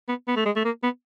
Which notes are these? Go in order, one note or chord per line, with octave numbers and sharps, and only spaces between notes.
B3
B3
A3
G#3
A3
A#3
B3